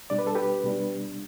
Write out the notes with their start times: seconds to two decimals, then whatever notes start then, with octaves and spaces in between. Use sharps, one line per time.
0.10 B2 G3 D4 D5
0.19 B4
0.27 A4
0.35 G4 B4
0.64 B2 G3 D4